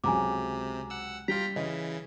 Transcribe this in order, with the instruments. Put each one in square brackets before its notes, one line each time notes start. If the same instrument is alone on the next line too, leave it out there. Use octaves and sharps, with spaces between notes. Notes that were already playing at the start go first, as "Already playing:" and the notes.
[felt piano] C#2 F#3 [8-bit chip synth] C3 [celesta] G#5 A#5 D6
[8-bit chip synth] F#5 E6
[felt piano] G3 [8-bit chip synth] F4 G5 A#5 [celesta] B6
[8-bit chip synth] C#3 E3 [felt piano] D#5